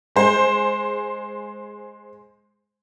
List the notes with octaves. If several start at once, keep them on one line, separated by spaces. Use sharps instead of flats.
G#3 C5